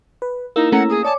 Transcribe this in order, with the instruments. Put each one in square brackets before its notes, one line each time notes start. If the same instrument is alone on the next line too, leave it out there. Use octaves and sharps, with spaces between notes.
[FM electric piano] B4
[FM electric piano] A#3 E6 [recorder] D#4 [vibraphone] E4
[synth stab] A3 C#4 A#5 [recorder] F#5
[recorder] G#4 [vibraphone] D#6
[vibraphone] C#5 D6 [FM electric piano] D5 G#5 [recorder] A5